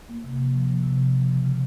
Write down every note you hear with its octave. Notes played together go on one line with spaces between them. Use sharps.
A#3
C3
F3
F3
F3
C3
F3
F3
C#3
C#3